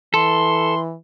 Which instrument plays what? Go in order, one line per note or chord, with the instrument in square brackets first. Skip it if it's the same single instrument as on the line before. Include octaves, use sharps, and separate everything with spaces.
[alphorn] E3 [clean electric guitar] A4 [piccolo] C6